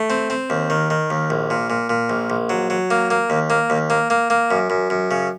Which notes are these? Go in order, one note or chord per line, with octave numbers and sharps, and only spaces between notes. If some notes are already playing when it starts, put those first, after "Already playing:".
Already playing: A3
C4
C4
D#2
D#3
D#3
D#2
A#1
A#2
A#2
A#2
A#1
A#1
F#3
F#3
A#3
A#3
D#2
A#3
D#2
A#3
A#3
A#3
F#2
F#2
F#2
C#3